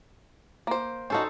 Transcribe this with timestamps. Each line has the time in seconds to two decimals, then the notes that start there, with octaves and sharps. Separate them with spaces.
0.67 A#3 C5
1.10 C#4 D#4 F#4 A4 C5